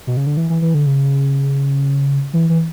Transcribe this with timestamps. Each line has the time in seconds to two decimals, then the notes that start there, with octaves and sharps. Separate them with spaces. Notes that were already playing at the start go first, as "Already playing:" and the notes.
0.07 B2
0.17 C#3
0.27 D3
0.37 E3
0.50 E3
0.62 E3
0.74 D3
0.86 C#3
2.33 E3
2.49 E3